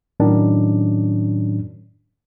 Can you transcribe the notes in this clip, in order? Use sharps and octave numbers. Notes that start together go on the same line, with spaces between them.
A2 D#3 F#3 C#4 D4